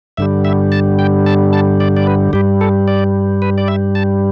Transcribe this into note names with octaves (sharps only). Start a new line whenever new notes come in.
G2 D3 G3 E5
E5
A5
G5
A5
A5
D5
D5
B4
G2 G3 G4
A4
D5
B4
D5
E5
A5